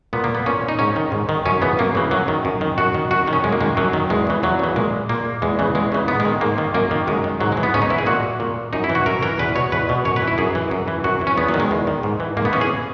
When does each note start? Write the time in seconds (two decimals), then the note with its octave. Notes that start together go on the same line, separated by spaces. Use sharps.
0.13 A#2 B3
0.24 A#3
0.35 B3
0.46 A#2 C#4
0.69 D#4
0.79 G#2 C#4
0.96 D#3
1.12 G#2
1.29 D#3
1.46 F#2 C#4
1.62 C#3 E3 B3
1.79 F#2 A#3
1.95 C#3 E3
2.11 F#2 F#3
2.28 D#3
2.45 F#2
2.61 D#3
2.78 F#2 F#4
2.95 D#3
3.11 F#2 F#4
3.27 D#3
3.33 C#4
3.44 F#2 G#3
3.52 A#3
3.60 D#3 G#3
3.77 F#2 F#3
3.93 D#3
4.10 E2 G#3
4.27 C#3 E3
4.43 E2 F#3
4.59 C#3 E3
4.76 A#2 G#3
5.09 A#2 A#3
5.42 E2 G#3
5.59 C#3 E3
5.75 E2 G#3
5.92 C#3 E3
6.08 G#2 B3
6.20 G#3
6.25 D#3
6.41 G#2 A#3
6.58 D#3
6.74 F#2 A#3
6.91 D#3
7.07 F#2 G#3
7.24 D#3
7.40 G#2 F#3
7.52 G#3
7.57 E3
7.63 B3
7.74 G#2 C#4
7.82 D#4
7.90 E3 E4
7.98 G#4
8.06 A#2 F#4
8.40 A#2
8.73 F#2 D#4
8.84 E4
8.89 E3
8.95 F#4
9.06 F#2 A#4
9.22 E3 A#4
9.39 E2 B4
9.56 B2 C#5
9.72 E2 B4
9.89 B2
10.05 F#2 C#5
10.16 B4
10.22 E3
10.28 E4
10.38 F#2 G#4
10.55 E3
10.71 F#2
10.88 E3
11.04 F#2 F#4
11.21 E3
11.27 C#4
11.37 E2 B3
11.49 F#3
11.54 D#3
11.60 G#3
11.71 E2
11.87 D#3
12.03 G#2
12.20 E3
12.37 G#2 A#3
12.45 B3
12.53 E3 C#4
12.61 G#4